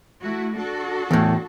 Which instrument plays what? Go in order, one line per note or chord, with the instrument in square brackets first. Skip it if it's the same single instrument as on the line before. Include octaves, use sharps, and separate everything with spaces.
[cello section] A3 E4 F#4
D4 F#4 A4
[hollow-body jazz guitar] E2 A2